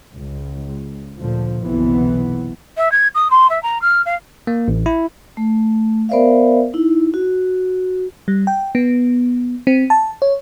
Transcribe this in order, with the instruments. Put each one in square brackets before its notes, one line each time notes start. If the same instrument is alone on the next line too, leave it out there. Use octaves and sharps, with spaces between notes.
[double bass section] C#2
D2 A#2 D3 F3
F#1 B1 C3 E3 B3
[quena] E5
G#6
D#6
C6
E5
A#5
F6
F5
[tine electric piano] A#3
A1
E4
[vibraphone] A3
B3 A#4 C5 D5 E5 F5
D#4 E4
F#4
[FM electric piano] G3
G5
B3
C4
A5
C#5